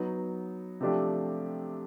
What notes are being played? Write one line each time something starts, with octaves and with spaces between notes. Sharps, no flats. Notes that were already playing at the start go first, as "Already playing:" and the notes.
Already playing: F#3 B3 D#4
C3 F3 A3 D4 G4